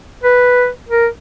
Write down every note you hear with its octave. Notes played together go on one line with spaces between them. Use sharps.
B4
A#4